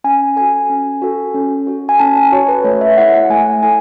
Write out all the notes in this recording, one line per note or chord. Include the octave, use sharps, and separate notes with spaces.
C#4 G#5
F#4 A4 G#5
C#4
F#4 A4
C#4
F#4 A4
G#5
C#4 A5
G#5
F#4 A4 C#5
B4
A3 C#5
E5
E4 A4 F#5
F#5
A3 G#5
E4 A4 G#5